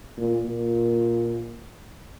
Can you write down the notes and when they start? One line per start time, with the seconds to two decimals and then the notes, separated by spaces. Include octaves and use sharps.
0.18 A#2
0.46 A#2